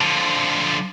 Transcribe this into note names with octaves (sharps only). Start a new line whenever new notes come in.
D3 F3